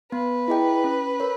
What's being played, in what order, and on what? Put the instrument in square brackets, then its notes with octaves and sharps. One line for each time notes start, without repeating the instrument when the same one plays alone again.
[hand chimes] B3 [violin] B4
[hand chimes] E4 G#4 D#5 G5
C#4
A#4 C#5